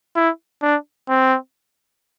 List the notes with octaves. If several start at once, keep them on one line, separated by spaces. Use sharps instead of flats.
E4
D4
C4